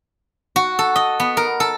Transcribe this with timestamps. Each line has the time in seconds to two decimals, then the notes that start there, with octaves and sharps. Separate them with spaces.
0.56 F#4
0.79 A4
0.96 D#5
1.20 B3
1.37 A#4
1.60 A4